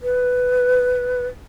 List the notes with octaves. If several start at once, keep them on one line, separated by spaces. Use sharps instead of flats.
B4